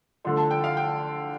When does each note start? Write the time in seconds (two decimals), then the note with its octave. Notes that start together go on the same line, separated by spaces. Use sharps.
0.25 D3 F3 A3 C6
0.37 A5
0.51 G5
0.64 F5
0.77 G5